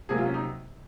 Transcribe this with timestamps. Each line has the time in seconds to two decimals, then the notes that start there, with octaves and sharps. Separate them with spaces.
0.09 C3 F#3 A#3 G#4
0.18 F4
0.26 C#4
0.34 D#4